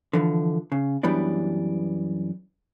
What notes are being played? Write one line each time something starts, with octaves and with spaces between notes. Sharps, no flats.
D3 E3 F3
C#3
F#2 E3 G3 B3 D4